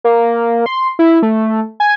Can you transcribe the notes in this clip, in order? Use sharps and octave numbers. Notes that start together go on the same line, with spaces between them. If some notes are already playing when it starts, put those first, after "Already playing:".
A#3
C6
E4
A3
G#5